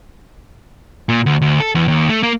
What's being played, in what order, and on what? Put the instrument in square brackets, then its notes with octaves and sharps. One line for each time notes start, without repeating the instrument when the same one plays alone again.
[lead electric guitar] A#2
D2
D2
A4
E2
D#2
A3
A#3